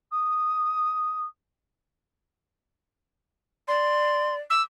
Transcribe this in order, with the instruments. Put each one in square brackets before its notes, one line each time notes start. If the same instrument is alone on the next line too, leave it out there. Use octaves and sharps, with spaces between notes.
[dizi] D#6
[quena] D5 [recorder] C6
[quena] D6 [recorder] E6